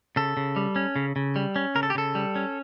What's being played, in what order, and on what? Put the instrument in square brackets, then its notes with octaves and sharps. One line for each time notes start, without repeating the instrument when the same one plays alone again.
[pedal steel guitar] C#3 A4
C#3
G3
C#4
C#3
C#3
G3
C#4
C#3 A#4
A4
G4
C#3 A4
G3
C#4